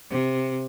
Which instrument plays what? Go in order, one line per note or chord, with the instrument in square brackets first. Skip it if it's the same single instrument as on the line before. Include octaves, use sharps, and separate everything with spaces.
[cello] C3